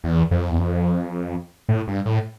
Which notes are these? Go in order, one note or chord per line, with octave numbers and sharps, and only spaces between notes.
E2
F2
E2
F2
A2
G2
A2